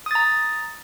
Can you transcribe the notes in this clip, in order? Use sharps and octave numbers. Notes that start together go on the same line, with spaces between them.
A#5 D#6 A6